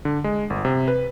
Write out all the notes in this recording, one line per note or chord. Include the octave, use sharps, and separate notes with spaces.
D3
G#3
G1
C3
B4